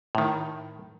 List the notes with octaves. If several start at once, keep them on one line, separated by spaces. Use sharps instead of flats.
A2 D#3